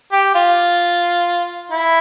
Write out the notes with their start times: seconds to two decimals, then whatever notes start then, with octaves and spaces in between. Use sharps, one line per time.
0.12 G4
0.35 F4
1.71 E4